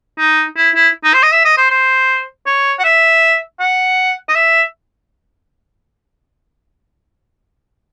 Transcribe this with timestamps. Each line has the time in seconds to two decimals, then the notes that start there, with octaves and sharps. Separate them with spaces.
0.18 D#4
0.57 E4
0.75 E4
1.04 D#4
1.14 C5
1.23 D#5
1.32 E5
1.45 D#5
1.58 C5
1.70 C5
2.46 C#5
2.79 F#5
2.84 E5
3.60 F#5
4.29 D#5
4.36 E5